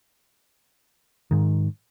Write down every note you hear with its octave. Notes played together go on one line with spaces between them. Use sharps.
G#2 D#3